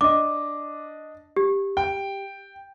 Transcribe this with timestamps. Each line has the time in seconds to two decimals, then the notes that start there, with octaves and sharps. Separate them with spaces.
0.01 D4 D#5 D6
1.37 G4
1.77 G5